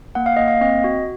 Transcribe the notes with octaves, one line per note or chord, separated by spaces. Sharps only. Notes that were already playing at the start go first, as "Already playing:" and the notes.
A#3 F#5
F5
A#3 D#5
F5
C4 D#5
F#4